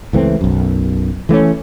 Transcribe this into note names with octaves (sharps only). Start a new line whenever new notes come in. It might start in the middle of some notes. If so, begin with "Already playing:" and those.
C#2 E3 A3 C4
B1 F#2
E3 A3 A#3 C#4